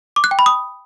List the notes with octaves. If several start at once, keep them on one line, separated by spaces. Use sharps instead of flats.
D6
F#6
G5
B5
D#6